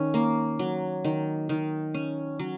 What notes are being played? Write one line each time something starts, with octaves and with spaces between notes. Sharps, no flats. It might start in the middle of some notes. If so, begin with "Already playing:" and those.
Already playing: D#3 C#4
A#3
F#3
D#3
D#3
C#4
F#3